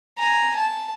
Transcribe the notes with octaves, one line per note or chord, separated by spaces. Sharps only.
G#5 A#5
A5